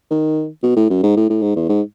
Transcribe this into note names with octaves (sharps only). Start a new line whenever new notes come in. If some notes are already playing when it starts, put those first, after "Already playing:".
D#3
B2
A2
F#2
G#2
A2
A2
G#2
E2
G#2